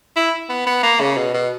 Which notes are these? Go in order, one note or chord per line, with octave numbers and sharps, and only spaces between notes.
E4
B3
B3
A#3
C#3
B2
B2